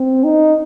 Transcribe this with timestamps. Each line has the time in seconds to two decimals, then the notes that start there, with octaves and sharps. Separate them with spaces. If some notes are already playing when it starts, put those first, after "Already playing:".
Already playing: C4
0.24 D#4